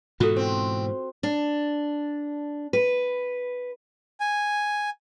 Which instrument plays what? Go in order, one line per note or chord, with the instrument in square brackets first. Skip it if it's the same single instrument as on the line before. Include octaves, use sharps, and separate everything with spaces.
[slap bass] G#2 B2 E3 [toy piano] F4 A4 [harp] F#4
[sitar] C4
[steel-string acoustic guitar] D4
B4
[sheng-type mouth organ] G#5